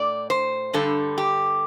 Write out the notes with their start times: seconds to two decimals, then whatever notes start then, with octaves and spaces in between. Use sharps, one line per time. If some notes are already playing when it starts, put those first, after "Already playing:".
Already playing: A2 D5
0.30 C5
0.73 G2 D3 G3 A4
1.18 G4